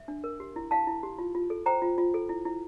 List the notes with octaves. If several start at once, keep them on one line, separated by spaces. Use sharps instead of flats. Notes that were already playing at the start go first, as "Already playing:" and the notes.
Already playing: E5
D4
A#4
G4
E4
E4 F5 A5
E4
G4
F4
F4
A4
C5 G5 A#5
F4
F4
A4
E4
E4